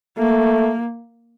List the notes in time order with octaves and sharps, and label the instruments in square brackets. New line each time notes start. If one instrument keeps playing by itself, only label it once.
[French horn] A3 [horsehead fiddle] A#3